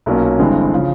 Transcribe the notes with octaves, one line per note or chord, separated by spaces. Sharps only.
B1 A#2 F#3 A#3 C#4
G1 G2 E3 G#3 C4
C#3 F3